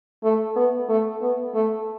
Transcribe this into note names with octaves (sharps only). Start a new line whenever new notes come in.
A3
B3
A3
B3
A3